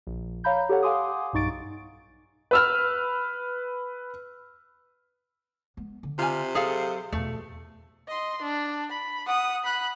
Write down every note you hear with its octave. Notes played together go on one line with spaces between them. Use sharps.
A#1
C#5 F5 A#5 B5 G6
G4 A4 C#5 F#5
F5 F#5 G#5 C6 D6 D#6
B1 G2 D#4 C#6 A6 D7
B4 E6 F6
G#3 B3
D3
C3 F4 G#5
F#3 G#4 A4 F5
E2 B2 A3
D#5 C6
D4
B5
F#5 D#6
B5 F#6